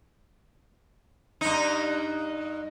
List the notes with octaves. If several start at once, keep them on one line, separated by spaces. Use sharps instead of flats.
G2 D#4